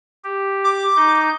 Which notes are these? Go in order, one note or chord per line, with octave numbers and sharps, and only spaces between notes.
G4
D6
D#4 G6